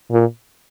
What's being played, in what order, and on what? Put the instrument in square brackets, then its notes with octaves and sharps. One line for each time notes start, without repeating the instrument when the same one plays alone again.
[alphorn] A#2